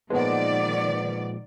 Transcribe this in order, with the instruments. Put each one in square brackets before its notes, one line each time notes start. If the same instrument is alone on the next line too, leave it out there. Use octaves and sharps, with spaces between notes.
[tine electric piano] A#2 F3 G#3 [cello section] D#3 D5 [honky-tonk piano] B3 F#5